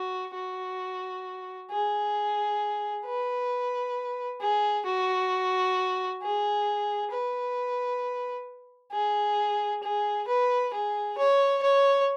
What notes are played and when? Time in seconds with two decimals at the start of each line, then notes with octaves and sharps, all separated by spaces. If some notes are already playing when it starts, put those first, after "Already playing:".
Already playing: F#4
0.35 F#4
1.71 G#4
3.05 B4
4.41 G#4
4.85 F#4
6.22 G#4
7.11 B4
8.92 G#4
9.83 G#4
10.27 B4
10.73 G#4
11.18 C#5
11.62 C#5